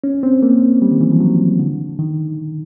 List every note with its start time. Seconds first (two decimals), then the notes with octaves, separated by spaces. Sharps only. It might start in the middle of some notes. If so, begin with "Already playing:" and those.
0.04 C#4
0.23 C4
0.43 A#3
0.82 G3
0.92 D#3
1.01 E3
1.11 F3
1.20 F#3
1.59 D3
1.99 D#3